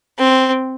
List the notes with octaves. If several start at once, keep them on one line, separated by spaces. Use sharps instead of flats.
C4